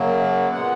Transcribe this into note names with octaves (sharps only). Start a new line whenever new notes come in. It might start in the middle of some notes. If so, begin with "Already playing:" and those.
Already playing: F#2 C#3 F#3 A#3
A#2 G#3 B3 F#5